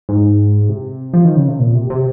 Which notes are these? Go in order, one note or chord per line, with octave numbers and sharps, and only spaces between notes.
G#2
C3
F3
D#3
C#3
C3
A#2
C3
C3